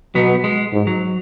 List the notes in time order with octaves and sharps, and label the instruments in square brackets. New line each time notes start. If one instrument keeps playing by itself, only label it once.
[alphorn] B2 [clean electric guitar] F#3 B3
[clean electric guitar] G#3
[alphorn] G#2
[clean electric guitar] F#3